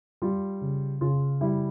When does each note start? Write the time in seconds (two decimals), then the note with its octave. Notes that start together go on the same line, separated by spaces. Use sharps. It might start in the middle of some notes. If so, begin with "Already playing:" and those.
0.22 G3 F4
0.61 C#3
1.01 C#3 F4
1.41 G3 E4